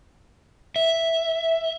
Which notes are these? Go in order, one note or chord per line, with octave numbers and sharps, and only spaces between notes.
E5